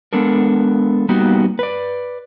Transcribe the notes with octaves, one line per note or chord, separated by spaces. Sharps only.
G#3 B3 D4 A4 A#4
G3 A#3 B3 D#4 F#4 G4
B4 D5